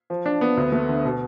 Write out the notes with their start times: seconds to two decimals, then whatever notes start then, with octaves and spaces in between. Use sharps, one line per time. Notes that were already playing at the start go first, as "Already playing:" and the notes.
0.10 F3
0.26 D4
0.41 B3
0.57 D2
0.72 A3
0.89 D3
1.05 B2